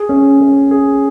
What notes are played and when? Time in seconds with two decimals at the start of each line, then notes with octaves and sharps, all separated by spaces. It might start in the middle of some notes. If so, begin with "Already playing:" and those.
Already playing: G#4
0.09 C#4
0.41 C#4
0.71 G#4